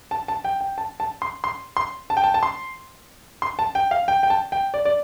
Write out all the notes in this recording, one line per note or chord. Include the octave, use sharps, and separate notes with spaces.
A5
A5
G5
G5
A5
A5
C6
C6
C6
A5
G5
A5
A5
C6
C6
A5
G5
F5
G5
G5
A5
G5
D5
D5